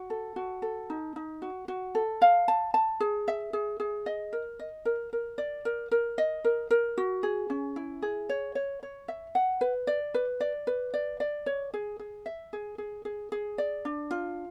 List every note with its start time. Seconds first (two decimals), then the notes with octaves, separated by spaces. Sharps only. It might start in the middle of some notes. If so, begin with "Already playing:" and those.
Already playing: F#4
0.10 A4
0.36 F#4
0.62 A4
0.90 D#4
1.16 D#4
1.42 F#4
1.68 F#4
1.95 A4
2.22 F5
2.48 A5
2.74 A5
3.00 G#4
3.28 E5
3.53 G#4
3.80 G#4
4.06 D#5
4.33 A#4
4.60 D#5
4.85 A#4
5.13 A#4
5.38 D5
5.65 A#4
5.91 A#4
6.18 D#5
6.45 A#4
6.71 A#4
6.98 F#4
7.23 G#4
7.50 C#4
7.76 E4
8.02 G#4
8.29 C#5
8.55 C#5
8.83 C#5
9.08 E5
9.35 F#5
9.61 B4
9.87 D5
10.14 B4
10.40 D5
10.67 B4
10.94 D5
11.20 D5
11.46 C#5
11.74 G#4
11.99 G#4
12.26 E5
12.53 G#4
12.78 G#4
13.05 G#4
13.32 G#4
13.58 D5
13.85 D4
14.11 F4